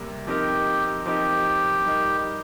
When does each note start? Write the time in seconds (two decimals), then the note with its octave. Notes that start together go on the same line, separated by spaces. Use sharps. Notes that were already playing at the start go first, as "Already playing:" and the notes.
Already playing: C3 G3 A#3
0.27 F3 C4 D#4 G4 A#4 D#5
1.06 F3 C4 D#4 G4 A#4 D#5
1.85 G3 D#4 A#4 D#5